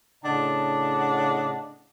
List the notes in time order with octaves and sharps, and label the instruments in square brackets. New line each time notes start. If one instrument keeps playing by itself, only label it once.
[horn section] A2 C#3 D4 D#5 F#5 A5